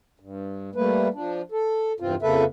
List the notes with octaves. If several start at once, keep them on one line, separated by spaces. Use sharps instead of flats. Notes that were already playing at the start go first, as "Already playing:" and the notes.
G2
G3 A3 A#3 B4
F3 D4
A4
E2 G2 C3 C4 F4
F2 C#3 A#3 A4 B4 E5